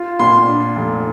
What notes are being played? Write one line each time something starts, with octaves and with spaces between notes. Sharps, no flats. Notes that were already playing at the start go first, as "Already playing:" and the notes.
Already playing: F4
A#2 C6
D4
F1